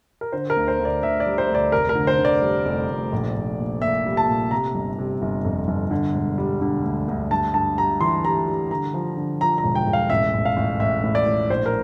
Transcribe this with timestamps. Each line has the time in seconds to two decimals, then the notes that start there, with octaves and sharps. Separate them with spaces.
0.21 A#4
0.32 D3 C5
0.50 A#4
0.57 D2
0.68 C5
0.79 D2
0.85 D5
1.02 D2 E5
1.20 D5
1.26 G3
1.38 C5
1.49 D2
1.55 D5
1.72 F1 A#4
1.89 A#4
1.95 D3
2.07 C5
2.19 D3
2.25 D5
2.42 G3
2.65 F1
2.89 F1
3.12 A#1
3.36 A#1
3.58 A#2
3.81 A#2 E5
4.06 G3
4.17 A5
4.28 A#2
4.51 C3 A#5
4.75 G1
4.99 C3
5.22 G1
5.45 F2
5.68 G1
5.91 D3
6.15 E1
6.38 G3
6.61 D3
6.84 D2
7.08 D2
7.31 G2 A5
7.54 G2 A5
7.77 G3 A#5
8.01 E3 C6
8.24 G3 A#5
8.47 G3
8.71 D3 A#5
8.94 F3
9.17 D3
9.41 F3 A#5
9.58 A#5
9.64 E1
9.75 G5
9.87 E1
9.93 F5
10.10 A1 E5
10.34 A1
10.45 F5
10.56 A1
10.80 A1 E5
11.04 A2
11.15 D5
11.26 A2
11.49 A#1 C5
11.66 A#4